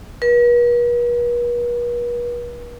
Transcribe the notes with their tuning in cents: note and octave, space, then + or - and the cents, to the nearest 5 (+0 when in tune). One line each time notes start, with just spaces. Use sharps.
B4 -45